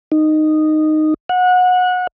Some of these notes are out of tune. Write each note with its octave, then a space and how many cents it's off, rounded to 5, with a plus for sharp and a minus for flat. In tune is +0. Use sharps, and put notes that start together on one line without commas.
D#4 -10
F#5 -25